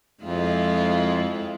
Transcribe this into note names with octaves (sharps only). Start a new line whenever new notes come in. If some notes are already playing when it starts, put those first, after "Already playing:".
F2 G#3 E4 F4